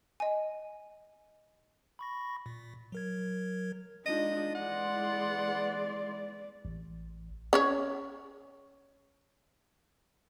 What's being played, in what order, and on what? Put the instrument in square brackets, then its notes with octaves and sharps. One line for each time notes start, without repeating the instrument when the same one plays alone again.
[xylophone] D#5 G#5
[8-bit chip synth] B5 C#6 A#6
A#2
F#3 A#4 G#6
[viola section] G#3 D#4 F4 [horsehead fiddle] D4 [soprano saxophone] D#5
[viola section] E3 G#3 C6 [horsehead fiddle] D5 [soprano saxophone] F#5
[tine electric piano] A1
[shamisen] C#4 G#4 C#5